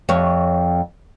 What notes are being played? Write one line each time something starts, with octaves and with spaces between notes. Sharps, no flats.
F2 C#5